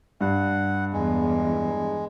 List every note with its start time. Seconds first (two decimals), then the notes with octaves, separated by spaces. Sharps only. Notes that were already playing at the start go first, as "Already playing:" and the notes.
0.21 G2 F#5
0.93 E2 G#3